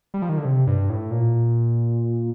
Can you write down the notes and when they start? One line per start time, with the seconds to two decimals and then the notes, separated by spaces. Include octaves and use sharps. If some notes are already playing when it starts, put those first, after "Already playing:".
0.14 G3
0.22 F3
0.29 D#3
0.37 D3
0.45 C3
0.67 G2
0.90 A2
1.11 A#2